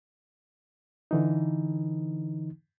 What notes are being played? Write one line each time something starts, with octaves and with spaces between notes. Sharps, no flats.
D3 E3 D#4